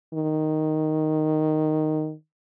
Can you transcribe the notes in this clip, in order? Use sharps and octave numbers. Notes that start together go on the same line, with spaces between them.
D#3